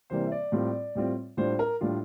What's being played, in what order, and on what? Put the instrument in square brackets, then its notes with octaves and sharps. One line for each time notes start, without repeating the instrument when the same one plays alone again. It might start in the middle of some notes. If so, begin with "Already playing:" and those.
[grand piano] C3 E3 G3 A#3 C5
E5
D5
A2 G3 C4 F4
A2 G3 C4 F4
A2 G3 D4 F4 C5
A#4
A2 G3 D4 F4